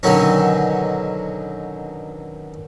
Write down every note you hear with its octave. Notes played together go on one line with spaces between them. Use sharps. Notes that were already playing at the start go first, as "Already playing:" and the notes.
B2 D3 D#3 F#3 C#4